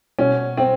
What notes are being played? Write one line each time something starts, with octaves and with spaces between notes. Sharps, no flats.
B2 C#4
C4